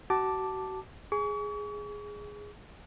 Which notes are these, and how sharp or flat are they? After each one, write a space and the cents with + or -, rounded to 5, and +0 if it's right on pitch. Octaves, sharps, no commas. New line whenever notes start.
F#4 +35 A5 +0 D6 +0
G#4 +0 C#6 +40